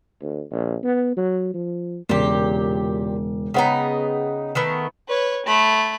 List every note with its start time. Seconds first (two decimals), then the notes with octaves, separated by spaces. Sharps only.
0.21 D2
0.51 A#1
0.84 B3
1.17 F#3
1.54 F3
2.09 E1 A#2 C#3 G4 D6
3.54 C#3 B3 D#4 C#5 F#5 G5
4.55 D#3 A3 B3
5.08 B4 C#5
5.46 A3 B5